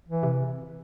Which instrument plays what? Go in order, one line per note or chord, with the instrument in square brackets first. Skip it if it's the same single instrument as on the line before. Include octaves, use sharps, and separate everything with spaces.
[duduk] E3
[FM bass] C3